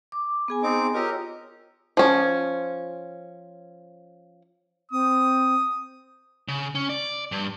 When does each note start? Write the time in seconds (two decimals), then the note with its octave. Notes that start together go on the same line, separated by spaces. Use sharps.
0.12 D6
0.48 B3 G#4 G#5
0.63 C4 D#4 D6
0.94 F4 G4 A#4 C#5 D#5 E6
1.97 F3 C#4
4.92 C4 D#6
6.48 C#3
6.75 C#4
6.89 D5
7.32 G2